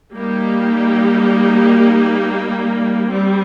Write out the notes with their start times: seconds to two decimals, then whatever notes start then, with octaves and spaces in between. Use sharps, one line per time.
0.14 G3 A#3 D#4 G4
3.12 G3 C4